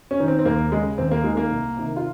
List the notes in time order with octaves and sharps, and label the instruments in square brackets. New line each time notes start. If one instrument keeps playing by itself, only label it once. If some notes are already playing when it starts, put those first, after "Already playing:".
[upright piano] C#4
D#3
C4
C4
D#2 A#3
C#3 G#3
D#2 C4
A#3
D#3 G#3
A#3
C2
C3 D#3
F4